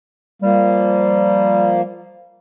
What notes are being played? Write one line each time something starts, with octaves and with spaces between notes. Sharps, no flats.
F3 G3 A#3